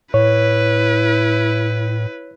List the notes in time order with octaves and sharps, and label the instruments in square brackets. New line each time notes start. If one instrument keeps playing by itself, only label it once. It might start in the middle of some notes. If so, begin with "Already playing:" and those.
[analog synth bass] A2 [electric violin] E4 B4 [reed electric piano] C#5